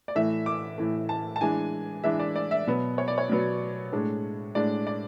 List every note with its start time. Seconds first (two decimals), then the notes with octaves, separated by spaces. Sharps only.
0.08 D5
0.15 A2 E3 A3 E5
0.46 D6
0.78 A2 E3 A3
1.09 A5
1.36 A5
1.41 E3 G#3 D4 G#5
2.04 E3 G#3 D4 E5
2.19 D5
2.36 D5
2.51 E5
2.67 B2 F#3 B3
2.98 C#5
3.08 D5
3.18 C#5
3.30 B2 F#3 B3
3.92 A2 G#3 D4
4.55 A2 G#3 D4 D5
4.87 D5